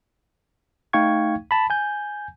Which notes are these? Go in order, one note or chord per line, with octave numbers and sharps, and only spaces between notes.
A3 D#4 F5 G5 C#6 G#6
A5 B5
G#5 G6